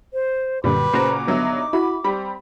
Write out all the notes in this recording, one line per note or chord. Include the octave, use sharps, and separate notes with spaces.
C5
F#2 A#2 D3 G3 B4 D6
A#2 C#3 F#4 C5 A#5
G2 D3 F#3 B3 D#4 E5
E4 F#4 B5
G3 C4 B5